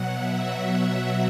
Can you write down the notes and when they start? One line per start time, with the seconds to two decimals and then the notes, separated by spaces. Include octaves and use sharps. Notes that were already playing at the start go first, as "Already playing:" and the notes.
Already playing: B2 F#3 F#5
0.11 E5